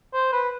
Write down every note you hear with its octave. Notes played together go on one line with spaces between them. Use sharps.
C5
B4